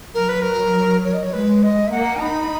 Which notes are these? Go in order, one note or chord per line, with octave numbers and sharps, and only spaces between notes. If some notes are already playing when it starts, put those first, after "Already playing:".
F#3 A#4
B4
A#4
C#5
D#5
C#5
G#3 B4
D#5
E5
A#3 F#5
D#4 B5